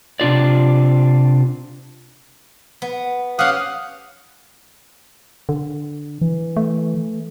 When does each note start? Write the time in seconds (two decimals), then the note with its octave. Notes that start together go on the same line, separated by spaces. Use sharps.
0.20 C3 D4 F4 D5
2.82 B3
3.39 C#4 G4 F5 F#5 D#6
5.49 D3
6.21 E3
6.57 A3